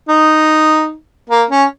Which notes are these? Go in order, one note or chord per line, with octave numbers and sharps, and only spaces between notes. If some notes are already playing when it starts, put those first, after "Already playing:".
D#4
A#3
C#4